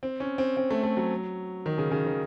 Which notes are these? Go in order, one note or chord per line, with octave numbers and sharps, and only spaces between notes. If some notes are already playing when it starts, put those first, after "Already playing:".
C4
C#4
C4
C4
A3
A3
F#3
D#3
C#3
C#3
D#3